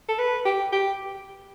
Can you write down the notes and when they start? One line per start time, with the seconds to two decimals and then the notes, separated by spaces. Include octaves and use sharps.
0.08 A4
0.19 B4
0.45 G4
0.72 G4